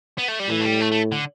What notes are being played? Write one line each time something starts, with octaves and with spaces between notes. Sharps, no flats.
B3
A3
G3
A2 E3
A3
G3
A3
A3
D3